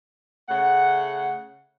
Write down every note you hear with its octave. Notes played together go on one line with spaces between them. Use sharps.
C#3 A3 F#5